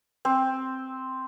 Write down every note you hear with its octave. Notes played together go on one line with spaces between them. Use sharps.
C4